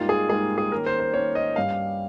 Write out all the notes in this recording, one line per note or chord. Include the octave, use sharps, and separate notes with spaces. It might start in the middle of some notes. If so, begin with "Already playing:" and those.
Already playing: G#2 G3 A#3 D#4 F4
G#4
G#2 G3 A#3 D#4 G#4
G#4
D#3 A#3 C#4 A#4
C5
C5
D#3 A#3 C#4 C#5
D#5
G2 G3 C#4 F5